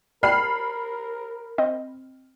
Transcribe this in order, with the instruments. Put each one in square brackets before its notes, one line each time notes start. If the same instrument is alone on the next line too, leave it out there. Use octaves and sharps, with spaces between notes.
[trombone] A#4 [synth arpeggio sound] D5 G5 A5 [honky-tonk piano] B5 F6 C7
[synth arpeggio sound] C4 D#5